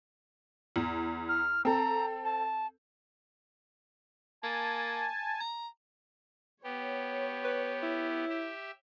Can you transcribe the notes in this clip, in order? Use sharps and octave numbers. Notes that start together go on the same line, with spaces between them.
E2
F6
C4 A4 A#5
A5
A#3 G#5 A5
A#5
B3 G4 C#5
B4
E4
G4 E5